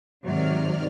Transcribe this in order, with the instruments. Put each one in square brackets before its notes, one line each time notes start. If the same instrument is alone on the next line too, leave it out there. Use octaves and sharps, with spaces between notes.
[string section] G#2 C3 F#3 [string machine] D#3 D5 F6